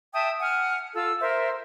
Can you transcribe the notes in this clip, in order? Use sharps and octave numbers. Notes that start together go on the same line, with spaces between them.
E5 G5 A5 D#6
F#5 G#5 F6
F4 A4 E6
A#4 C5 E5